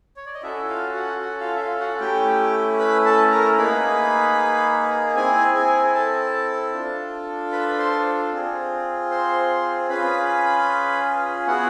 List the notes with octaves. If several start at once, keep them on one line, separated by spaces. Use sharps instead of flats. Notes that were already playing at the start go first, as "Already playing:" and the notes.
C#5
D5
D#5
C#4 E4 F#4 A4 E5
F4 F5
F#4 F#5
F#4 F#5
F4 F5
E5
F4 F5
F#4 F#5
A3 C#4 E4 G4 G5
B4 B5
A4 A5
A#4 A#5
A#3 D#4 G#4 B4 B5
C4 E4 G#4 G#5
G#4 G#5
G#5
A4 A5
D4 F4 A4
B4 B5
C5 C6
C4 F4 G#4
C5 C6
C#4 F4 G#4 B4 B5
B3 E4 F#4 G#4 F#5